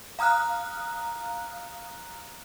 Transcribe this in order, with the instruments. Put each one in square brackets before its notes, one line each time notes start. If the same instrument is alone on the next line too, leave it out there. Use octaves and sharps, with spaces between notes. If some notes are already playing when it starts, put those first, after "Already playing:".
[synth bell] F5 A#5 D#6 F6 F#6